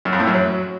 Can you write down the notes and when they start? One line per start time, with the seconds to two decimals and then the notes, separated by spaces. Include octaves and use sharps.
0.05 F#2
0.13 F2
0.20 A2
0.27 F#2
0.34 F#3